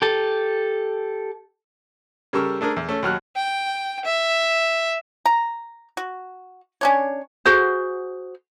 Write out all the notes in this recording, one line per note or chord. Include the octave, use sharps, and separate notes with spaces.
G4 A4
C#3 G3 A4 A#4 C#6 E6
A3 D4 G#4 A#4
E2
A3 C#4
D#2 F#3 F6 F#6
G5
E5
A#5
F#4
C#4 D4 C#5
F#4 G#4 C5